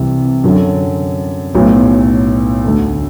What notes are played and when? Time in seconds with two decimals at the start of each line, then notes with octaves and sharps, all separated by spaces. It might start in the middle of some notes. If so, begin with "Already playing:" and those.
Already playing: C2 C3 E3
0.44 F#2 D3 F#3
1.55 B1 A2 F#3 B3
2.64 D2 D3 A3